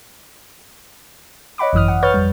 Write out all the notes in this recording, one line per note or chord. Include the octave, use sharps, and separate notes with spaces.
C#5 D#5 F#5 B5 D6
G#1 F#2 E3 D#6 F6
F#5
B4 C#5 C#6 F6 G6 A6
F2 G3